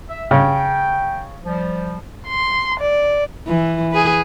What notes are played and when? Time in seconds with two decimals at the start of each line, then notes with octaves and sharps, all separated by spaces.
0.09 E5
0.31 C#3 G5
1.45 F3 G3
2.28 C6
2.80 D5
3.48 E3
3.91 G#4 B4